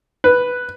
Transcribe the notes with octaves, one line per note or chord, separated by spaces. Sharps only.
B4